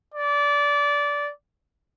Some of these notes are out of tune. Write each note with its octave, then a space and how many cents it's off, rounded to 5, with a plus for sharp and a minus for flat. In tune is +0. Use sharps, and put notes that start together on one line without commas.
D5 -20